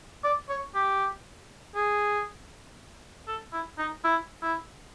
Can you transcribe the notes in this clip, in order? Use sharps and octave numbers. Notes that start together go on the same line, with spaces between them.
D5
C#5
G4
G#4
A4
E4
D#4
E4
E4